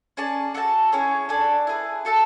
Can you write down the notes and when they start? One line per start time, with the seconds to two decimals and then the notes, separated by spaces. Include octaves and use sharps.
0.17 C#4 G#4 D5 A5
0.54 F#4 A4 E5 A5
0.92 C#4 E4 G#4 C#5
1.29 D4 A4 D5 G#5
1.67 E4 G#4 B4
2.05 F#4 A4 E5 A5